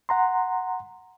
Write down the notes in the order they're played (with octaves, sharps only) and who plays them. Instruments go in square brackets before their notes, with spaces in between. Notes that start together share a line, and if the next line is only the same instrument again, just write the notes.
[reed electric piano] F#5 A#5 C6